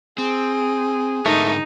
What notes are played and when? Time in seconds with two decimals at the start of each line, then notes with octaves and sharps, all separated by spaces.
0.18 C4 G#4
1.26 G#2 D3 A3 D#4 A#4